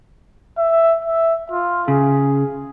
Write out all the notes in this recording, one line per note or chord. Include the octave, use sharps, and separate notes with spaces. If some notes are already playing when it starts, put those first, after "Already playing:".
E5
E5
F4
C#3 G#4